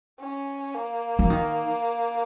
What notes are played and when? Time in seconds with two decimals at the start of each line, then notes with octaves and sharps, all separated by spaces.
0.20 C#4
0.75 A#3
1.19 F#3
1.30 D#3